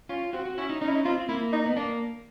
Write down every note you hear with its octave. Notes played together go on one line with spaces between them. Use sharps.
C#4 F4
C4 F#4
F#4
C#4 E4
D#4
C#4 D#4
E4
D#4
C4 F4
A#3 E4
D#4
B3
A#3 D4